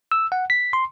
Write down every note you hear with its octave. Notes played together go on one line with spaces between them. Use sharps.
E6
F#5
B6
C6